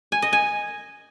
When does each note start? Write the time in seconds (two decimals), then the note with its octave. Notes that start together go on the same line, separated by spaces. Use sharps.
0.12 G#5
0.22 D#5
0.33 G#5